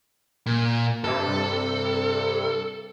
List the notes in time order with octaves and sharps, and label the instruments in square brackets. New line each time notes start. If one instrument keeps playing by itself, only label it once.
[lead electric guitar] A#2
[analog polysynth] G2 C3 [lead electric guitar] A4